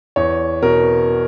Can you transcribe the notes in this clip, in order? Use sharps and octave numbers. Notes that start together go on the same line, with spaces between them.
E2 C#5
B2 A#4